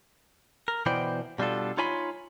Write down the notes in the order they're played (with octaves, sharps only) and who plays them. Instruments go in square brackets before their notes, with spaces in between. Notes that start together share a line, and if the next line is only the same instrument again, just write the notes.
[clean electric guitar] A#4
B2 E3 B3 C5 D5 G5
B2 G3 D4 F4 A4
D#4 F4 C#5 G#5 B5 C6